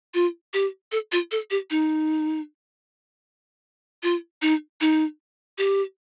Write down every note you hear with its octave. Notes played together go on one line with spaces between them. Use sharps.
F4
G4
A4
F4
A4
G4
D#4
F4
D#4
D#4
G4